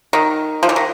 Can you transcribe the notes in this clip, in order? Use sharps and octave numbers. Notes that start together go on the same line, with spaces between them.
D#3
F3
E3
D#3